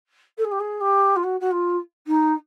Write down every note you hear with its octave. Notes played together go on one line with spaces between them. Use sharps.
A4
G#4
G4
G#4
G4
F4
F#4
F#4
F4
D#4